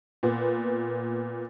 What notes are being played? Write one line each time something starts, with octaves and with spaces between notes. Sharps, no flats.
A#2 B3